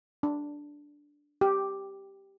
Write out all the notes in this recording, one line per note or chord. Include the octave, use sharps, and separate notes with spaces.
D4
G4